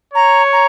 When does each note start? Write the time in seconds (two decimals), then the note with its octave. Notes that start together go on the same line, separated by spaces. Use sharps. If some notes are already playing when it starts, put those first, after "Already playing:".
0.14 C#5 A#5
0.52 A#5